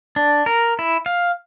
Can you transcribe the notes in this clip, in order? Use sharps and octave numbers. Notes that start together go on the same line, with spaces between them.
D4
A#4
E4
F5